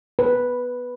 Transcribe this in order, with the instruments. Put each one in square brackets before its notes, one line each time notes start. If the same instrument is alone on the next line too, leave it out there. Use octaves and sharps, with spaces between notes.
[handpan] B4